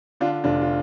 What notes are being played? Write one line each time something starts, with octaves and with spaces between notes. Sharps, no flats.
D3 D4 F4
F1 D4 F4
F4